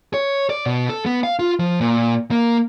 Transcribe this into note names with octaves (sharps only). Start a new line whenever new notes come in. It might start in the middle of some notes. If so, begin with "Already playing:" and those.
C#5
D5
B2
A4
B3
F5
F4
F3
A#2
A#3